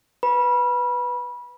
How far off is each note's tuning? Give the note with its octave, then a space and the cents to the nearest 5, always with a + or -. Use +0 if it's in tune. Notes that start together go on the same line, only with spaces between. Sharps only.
B4 +0 B5 -25